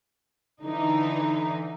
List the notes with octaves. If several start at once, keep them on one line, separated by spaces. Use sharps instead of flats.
D3 E3 D#4